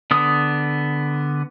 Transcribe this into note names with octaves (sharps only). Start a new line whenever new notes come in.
D3 B3 D#6